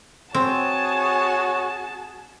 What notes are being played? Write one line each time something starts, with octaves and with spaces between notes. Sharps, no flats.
C4 F#4 G#4 C#5 A5